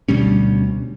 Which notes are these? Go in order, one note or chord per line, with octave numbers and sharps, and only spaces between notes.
D2 B2 G3 C#4